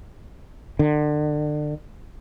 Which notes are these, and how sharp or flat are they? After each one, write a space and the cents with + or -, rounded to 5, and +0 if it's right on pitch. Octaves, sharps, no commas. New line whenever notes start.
D3 +30